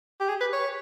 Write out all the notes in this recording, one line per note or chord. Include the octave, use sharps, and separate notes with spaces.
G4
G#4
B4
C#5